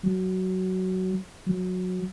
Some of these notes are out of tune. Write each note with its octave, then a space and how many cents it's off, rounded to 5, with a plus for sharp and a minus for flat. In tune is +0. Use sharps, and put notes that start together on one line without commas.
F#3 +10
F#3 -15